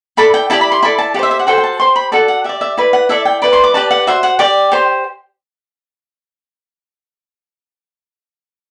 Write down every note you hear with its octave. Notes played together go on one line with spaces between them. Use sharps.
E4 A4 D5 B5
G5
E4 G4 D5 A5
B5
C6
E4 A4 D5 B5
A5
G4 C5 E5 F#5
E5
F#5
F#4 A4 C5 G5
G5
A5
G4 C5 C6
B5
F#4 A4 D5 A5
F#5
G4 D5 E5
E5
E4 B4 D5
F#5
E4 A4 D5 E5
G5
E4 B4 D5 B5
C6
D6
G4 B4 D5 A5
F#5
F#4 C5 E5
F#5
G4 D5 G5
G4 C5